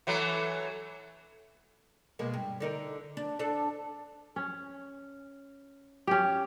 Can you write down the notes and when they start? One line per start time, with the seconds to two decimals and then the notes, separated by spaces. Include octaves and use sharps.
0.07 E3 F#3 A3
2.19 B2 G#3 A#3
2.34 G2
2.60 D3 D#4 A#4
3.17 D4
3.39 D4 A4
4.36 C#4
6.07 C#4 G4